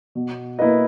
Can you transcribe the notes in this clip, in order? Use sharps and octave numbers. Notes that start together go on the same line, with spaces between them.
B2
A#3 E4 B4 D#5